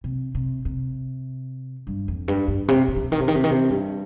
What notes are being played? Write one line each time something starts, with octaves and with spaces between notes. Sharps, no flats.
C3
C3
C3
G2
F2
G2
G2
C3
C3
D#3
C3
D#3
C3
D#3
C3
D#3
C3
G2